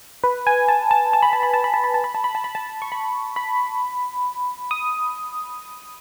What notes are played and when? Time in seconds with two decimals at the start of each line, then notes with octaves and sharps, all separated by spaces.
0.24 B4
0.47 G#5
0.69 A5
0.91 A5
1.13 A5
1.23 B5
1.33 A5
1.43 B5
1.54 A5
1.64 B5
1.74 A5
1.84 B5
1.94 A5
2.04 B5
2.15 A5
2.24 B5
2.35 A5
2.44 B5
2.55 A5
2.82 C#6
2.92 B5
3.36 B5
4.71 D#6